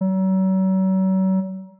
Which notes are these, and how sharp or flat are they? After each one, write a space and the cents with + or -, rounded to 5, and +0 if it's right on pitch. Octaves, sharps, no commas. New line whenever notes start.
F#3 +40